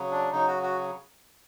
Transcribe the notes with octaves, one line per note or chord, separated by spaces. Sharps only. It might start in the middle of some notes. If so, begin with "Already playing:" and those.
Already playing: C#3 F#3
D4
C#3 F#3 D#4
F#4
F#4